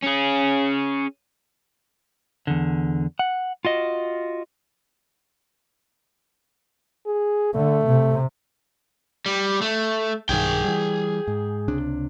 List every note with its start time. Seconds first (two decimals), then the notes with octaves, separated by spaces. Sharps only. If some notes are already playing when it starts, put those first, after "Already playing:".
0.04 C#4 G#4
2.47 E2 D3
3.19 F#5
3.65 F4 F#4 D#5
7.06 G#4
7.54 D3 A3
7.87 C3
9.26 G3
9.61 A3
10.29 B1 G2 D#3 G#4 G5
10.64 E3 G3
11.28 G#2
11.68 C#2 C3 D4